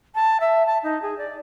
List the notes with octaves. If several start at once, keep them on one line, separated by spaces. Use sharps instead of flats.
A5
E5
A5
D#4
G#4
D5